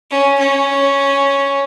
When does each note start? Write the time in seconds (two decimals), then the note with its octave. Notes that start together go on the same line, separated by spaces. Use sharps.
0.11 C#4
0.39 C#4